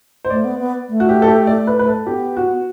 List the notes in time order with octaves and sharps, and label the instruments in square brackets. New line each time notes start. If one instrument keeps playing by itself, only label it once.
[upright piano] C5
[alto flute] A3 [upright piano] D5
[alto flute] B3
B3
A3
[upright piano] F#4
G4
A4
G4
D5
B4
B4
A4
[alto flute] B3 [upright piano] G4
[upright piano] F#4